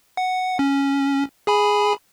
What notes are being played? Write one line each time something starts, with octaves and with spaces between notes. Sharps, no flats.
F#5
C#4
G#4 G#5 B5